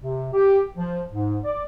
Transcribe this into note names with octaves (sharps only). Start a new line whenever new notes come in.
C3
G4
F3
G#2
D5